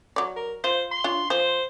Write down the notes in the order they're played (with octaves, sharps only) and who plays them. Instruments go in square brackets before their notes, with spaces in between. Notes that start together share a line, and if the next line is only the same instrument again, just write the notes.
[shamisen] F#3 D5
[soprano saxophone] A#4
[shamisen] F4 [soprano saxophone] C5
[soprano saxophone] C6
[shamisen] D4 F4 C#5
[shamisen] F3 [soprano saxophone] C5